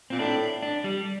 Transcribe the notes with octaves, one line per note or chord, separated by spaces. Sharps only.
A#2 C4
A2 D4
D4
G3